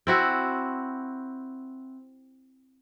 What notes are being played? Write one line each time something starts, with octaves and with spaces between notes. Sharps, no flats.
C4 E4 F#4